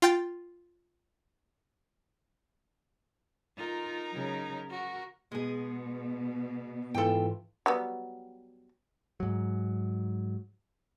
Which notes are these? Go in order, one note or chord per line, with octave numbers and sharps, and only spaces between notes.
F4 G5 A6
D#4 F4 A#4
C#3 F#3
F#4 A#4
B2 G#3 G#4
G#2 E3 F4 A4 G5
F#3 G3 B3
G#2 F#3